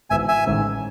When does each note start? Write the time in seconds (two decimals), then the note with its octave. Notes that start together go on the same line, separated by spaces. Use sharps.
0.10 G#1 G#2 E3 B3 E5 G#5
0.28 E5 G#5
0.46 A1 G#2 D#3